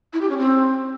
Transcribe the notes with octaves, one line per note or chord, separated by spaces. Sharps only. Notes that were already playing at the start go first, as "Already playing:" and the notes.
E4
G4
C#4
C4